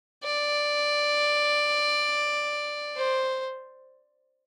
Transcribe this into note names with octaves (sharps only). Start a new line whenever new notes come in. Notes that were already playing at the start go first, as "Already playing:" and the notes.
D5
C5